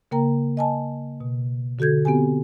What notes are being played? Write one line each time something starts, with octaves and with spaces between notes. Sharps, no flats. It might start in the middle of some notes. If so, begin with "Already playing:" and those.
C#3 A#3 A#4 G5 A#5
D#5 G#5 A5
B2
D3 F#4 A4 G6 G#6
B3 C4 G4 G#5